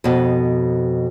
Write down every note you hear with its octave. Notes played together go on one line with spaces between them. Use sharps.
F2 B2